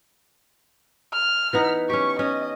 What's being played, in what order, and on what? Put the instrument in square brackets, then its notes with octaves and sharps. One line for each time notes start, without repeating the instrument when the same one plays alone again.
[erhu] F6
[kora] E3 B3 D#4
[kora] C#4 G4 [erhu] C#6
[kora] C#4 [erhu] D#5